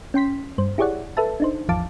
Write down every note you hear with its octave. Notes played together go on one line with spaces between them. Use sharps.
C#4 G5 C6 B6
G2 C5
E4 G4 G#4 C#5 D5 F#5
A4 B4 E5 A5
D4 D#4 C5
G#1 E2 F3 F5 A5 D6